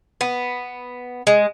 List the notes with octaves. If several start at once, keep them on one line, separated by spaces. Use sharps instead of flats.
B3
G#3